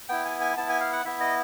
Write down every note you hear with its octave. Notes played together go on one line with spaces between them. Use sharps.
B3 E4 G5
G#5
G#5
B3 E4 A5
G#5
F5
F#5
B3 E4 E5
D#5